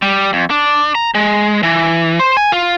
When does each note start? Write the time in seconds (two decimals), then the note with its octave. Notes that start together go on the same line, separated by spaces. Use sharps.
0.02 G3
0.33 F2
0.50 D4
0.95 A#5
1.15 G#3
1.63 E3
2.19 C5
2.37 G#5
2.52 F4